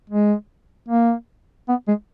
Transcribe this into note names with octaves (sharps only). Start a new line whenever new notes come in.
G#3
A#3
B3
G#3